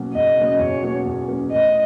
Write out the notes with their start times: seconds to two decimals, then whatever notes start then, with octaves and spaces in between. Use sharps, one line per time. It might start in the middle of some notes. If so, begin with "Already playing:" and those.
Already playing: B2 F#3 A#3 C#4
0.13 E2 D#5
0.37 B2 F#3 A#3 C#4
0.59 E2 C#5
0.83 B2 F#3 A#3 C#4
1.05 E2
1.28 B2 F#3 A#3 C#4
1.51 A2 D#5